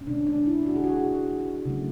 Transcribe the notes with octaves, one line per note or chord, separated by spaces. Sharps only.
C#4
B2 G#3 B3 D4
D4
E4
F#4
G#4
F#4
C#3 F#3 A3